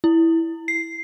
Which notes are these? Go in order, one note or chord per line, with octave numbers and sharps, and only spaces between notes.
E4
C7